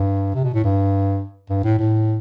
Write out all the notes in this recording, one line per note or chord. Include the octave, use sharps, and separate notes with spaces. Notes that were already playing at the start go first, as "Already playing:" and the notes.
Already playing: G2
C3
B2
A2
G2
G2
A2
A2